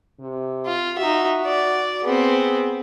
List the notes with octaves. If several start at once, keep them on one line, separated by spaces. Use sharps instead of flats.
C3
F4
D#4 F#4 E5
D5
B3 C4 G#4